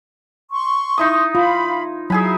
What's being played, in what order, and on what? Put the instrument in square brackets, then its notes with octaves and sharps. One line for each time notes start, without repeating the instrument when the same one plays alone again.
[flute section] C6 C#6
[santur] D#4 E4 D#6
[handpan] F4 [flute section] F5 B5
[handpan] F#3 [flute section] D#4 E4 [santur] G#4 G#5 B5